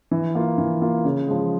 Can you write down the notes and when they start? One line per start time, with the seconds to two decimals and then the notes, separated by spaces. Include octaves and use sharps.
0.11 E3
0.35 A#3 F4
0.58 E3
0.82 A#3 F4
1.04 C#3
1.28 F3 G#3